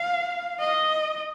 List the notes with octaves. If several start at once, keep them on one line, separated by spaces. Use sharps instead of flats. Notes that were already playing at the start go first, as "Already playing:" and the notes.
Already playing: F5
D#5